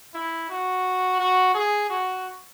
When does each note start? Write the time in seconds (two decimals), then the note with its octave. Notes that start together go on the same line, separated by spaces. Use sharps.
0.14 E4
0.49 F#4
1.19 F#4
1.54 G#4
1.90 F#4